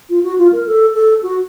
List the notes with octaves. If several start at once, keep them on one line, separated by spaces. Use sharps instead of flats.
F4
F#4
F4
A#4
A4
A4
F#4